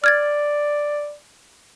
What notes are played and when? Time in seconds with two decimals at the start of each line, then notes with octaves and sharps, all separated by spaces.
0.04 D5 F6 G#6 A6